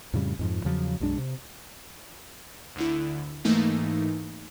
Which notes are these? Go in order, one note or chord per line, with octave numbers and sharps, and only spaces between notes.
F2 A2 C#3 G3
F2 G#2 F3
E2 C#3 F3 F#3
B1 F#2 G#3 D4
C3
D2 D3 E4
G#2 E3 A3 A#3 D#4